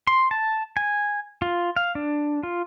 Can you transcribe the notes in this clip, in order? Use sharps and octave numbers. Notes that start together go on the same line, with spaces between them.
C6
A5
G#5
F4
F5
D4
F4